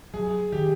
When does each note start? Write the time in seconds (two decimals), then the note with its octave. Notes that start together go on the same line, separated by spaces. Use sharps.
0.14 F#3 G#4
0.52 D#3 G4